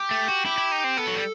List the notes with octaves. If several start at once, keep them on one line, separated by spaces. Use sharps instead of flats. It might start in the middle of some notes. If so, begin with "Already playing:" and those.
Already playing: G4
A3
F#4
E4 G4
E4
D#4
C4
B3 A4
F#3
G3